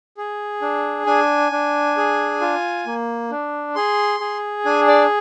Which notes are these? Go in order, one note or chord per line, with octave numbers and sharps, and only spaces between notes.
G#4
D4
D4 G#5
D4
G#4
F4
A#3
D4
G#4 C6
G#4
D4 G#5
D5